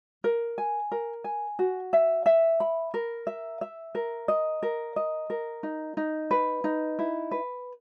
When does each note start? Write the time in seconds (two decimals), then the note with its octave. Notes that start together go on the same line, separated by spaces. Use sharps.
0.24 A#4
0.58 G#5
0.92 A#4
1.24 G#5
1.59 F#4
1.93 E5
2.26 E5
2.60 B5
2.94 A#4
3.27 E5
3.61 E5
3.95 A#4
4.28 D#5
4.63 A#4
4.96 D#5
5.30 A#4
5.63 D#4
5.97 D#4
6.31 B4
6.64 D#4
6.99 E4
7.31 B4